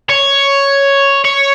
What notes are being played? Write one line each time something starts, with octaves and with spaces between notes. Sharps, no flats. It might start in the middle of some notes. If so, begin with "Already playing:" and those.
C#5
C#5